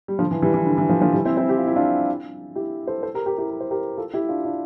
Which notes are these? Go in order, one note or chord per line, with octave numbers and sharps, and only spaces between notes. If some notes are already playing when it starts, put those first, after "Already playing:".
G3
D3 F3
E3
E3 G3
E3
D3
E3
D3 F3
D3 F3
E3 G3
C4 E4
C4 E4
G4
F4
E4
D4 F4
E4 G4
A4 C5
A4 C5
G4 A#4
G4 A#4
E4 G4
A#4
C5
G4 A#4
F4 A4
E4 G4
D4 F4
D4 F4